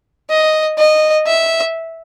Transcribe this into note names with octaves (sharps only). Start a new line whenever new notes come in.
D#5
D#5
E5